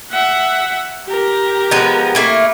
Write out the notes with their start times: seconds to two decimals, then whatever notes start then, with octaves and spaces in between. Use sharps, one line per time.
0.11 E5 F#5
1.06 G4 A#4
1.71 F3 G#3 B3
2.15 A3 A#3 E4